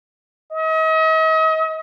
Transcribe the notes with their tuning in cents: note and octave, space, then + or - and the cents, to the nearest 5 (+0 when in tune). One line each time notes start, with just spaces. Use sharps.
D#5 +40